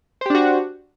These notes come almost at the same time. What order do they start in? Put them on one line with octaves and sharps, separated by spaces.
C5 G4 D4 F#4